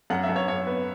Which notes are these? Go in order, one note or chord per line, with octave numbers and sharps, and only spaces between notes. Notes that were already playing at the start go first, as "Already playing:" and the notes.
F#2 F#5
E5
F#2
C#5
F#2 C#5
B3